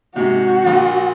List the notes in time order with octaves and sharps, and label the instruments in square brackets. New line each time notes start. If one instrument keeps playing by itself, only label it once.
[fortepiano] G#2 C3 [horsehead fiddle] F#4
[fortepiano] A#1